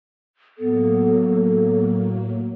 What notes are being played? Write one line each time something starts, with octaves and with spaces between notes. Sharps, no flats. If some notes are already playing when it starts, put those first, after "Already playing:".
A2 F#3 A#3 B3 A4